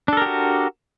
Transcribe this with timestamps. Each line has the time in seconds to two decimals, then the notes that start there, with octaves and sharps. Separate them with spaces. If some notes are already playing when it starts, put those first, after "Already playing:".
0.08 D4
0.13 A4
0.17 A#4
0.22 G4
0.26 F#4